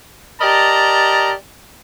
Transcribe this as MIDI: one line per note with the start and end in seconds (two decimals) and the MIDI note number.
0.41 1.32 67
0.41 1.32 70
0.41 1.32 74
0.41 1.32 75
0.41 1.32 81
0.41 1.32 82